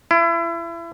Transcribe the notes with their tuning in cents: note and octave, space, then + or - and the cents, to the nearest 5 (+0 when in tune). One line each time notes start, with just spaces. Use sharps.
E4 +30